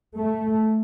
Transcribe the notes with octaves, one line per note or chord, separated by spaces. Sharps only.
A3